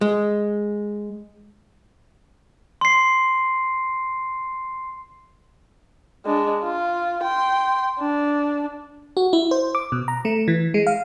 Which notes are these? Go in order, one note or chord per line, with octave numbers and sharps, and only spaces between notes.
G#3
C6 C7
G#3 D4
F4
G5 C6
D4
F#4
E4
C5
D6
B2
A#5
A3
E3
G#3
F5